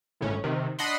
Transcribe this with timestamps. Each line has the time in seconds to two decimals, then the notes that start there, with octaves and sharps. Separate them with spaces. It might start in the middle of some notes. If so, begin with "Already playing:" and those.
0.21 G#1 A2 C#3 C#4
0.44 C3 D#3
0.79 D4 D#5 F#5 B5 C6